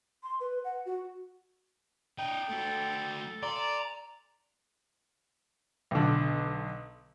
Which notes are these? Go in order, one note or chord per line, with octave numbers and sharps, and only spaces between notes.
C6
B4
F#5
F#4
D4 D#5 G5
A3 F#4 A4
D5 A#5 C6
B1 D3